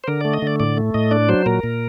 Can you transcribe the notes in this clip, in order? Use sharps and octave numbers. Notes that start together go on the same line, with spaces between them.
C5
D3 A#4
A3 D5
D#5
D3 D5
A2 D5
A3
A2 D#5
D4 D5
F#3 C5
A#2 A#4
A#2